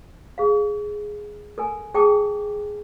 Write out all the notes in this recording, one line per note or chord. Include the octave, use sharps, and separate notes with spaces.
G#4 F5
A4 A#4 G#5
G#4 G5 A5 D6 D#6